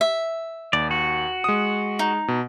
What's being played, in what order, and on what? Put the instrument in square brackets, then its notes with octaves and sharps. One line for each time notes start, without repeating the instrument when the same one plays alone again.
[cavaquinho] E5
[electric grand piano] D#2 [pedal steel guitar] D5
[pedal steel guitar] F#4
[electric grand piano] G#3 D#6
[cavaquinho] D#4
[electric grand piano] B2